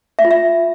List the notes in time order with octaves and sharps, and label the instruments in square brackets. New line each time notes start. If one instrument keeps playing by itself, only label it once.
[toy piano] E5
F4
E5